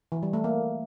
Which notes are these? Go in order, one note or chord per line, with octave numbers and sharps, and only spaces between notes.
E3
G3
A3
A#3